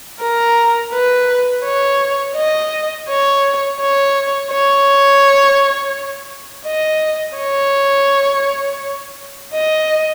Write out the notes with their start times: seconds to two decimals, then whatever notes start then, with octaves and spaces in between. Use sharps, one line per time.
0.21 A#4
0.93 B4
1.65 C#5
2.36 D#5
3.09 C#5
3.81 C#5
4.51 C#5
6.66 D#5
7.37 C#5
9.53 D#5